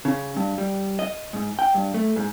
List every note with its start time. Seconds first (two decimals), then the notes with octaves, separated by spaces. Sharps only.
0.05 C#3
0.37 G2
0.58 G3
0.99 D#5
1.33 G#2
1.59 G5
1.74 G2
1.94 A3
2.16 G#2